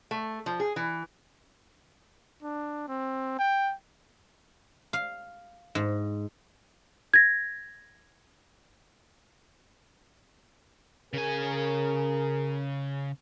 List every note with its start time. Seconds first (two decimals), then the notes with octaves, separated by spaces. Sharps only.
0.11 A3
0.46 F3
0.60 G#4
0.76 E3
2.43 D4
2.88 C4
3.39 G5
4.93 F5
5.75 G#2
7.14 G#6 A#6
11.13 C#3 G#4 A#4 G#5